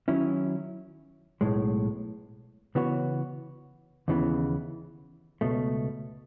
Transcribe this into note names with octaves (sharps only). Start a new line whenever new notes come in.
D#3 F#3 C#4 E4
B1 A2 G#3
C#3 E3 B3 F#4 C#5
D#2 C#3 E3 B3
C#2 B2 A3